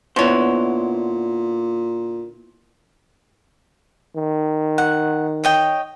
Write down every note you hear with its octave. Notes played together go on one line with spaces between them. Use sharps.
A#2 D3 B3 E4 C5 C#5
D#3
F#5
C#5 D#5 G5